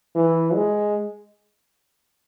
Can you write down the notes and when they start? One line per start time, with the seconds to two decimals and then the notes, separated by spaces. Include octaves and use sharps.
0.15 E3
0.55 G#3